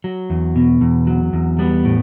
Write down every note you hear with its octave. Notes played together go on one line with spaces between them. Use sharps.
F#3
E2
B2
E2
F#3
E2
G3 B3
A2